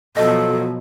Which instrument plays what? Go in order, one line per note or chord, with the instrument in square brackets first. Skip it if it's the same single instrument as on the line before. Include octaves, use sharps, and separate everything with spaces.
[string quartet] B2 F3 F#3 [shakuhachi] A4 [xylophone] D#5